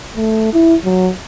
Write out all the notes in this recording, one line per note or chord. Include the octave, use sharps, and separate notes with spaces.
A3
E4
F#3